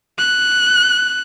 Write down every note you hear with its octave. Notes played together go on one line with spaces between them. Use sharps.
F#6